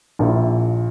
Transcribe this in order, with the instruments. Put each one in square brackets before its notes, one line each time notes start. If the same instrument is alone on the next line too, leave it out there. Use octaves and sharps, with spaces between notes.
[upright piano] A#1 A#2 A#3 E4